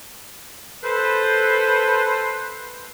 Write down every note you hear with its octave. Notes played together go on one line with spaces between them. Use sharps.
A4 B4 C5